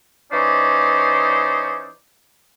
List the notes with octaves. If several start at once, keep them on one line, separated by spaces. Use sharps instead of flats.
E3 C#4 D#4 C5 D5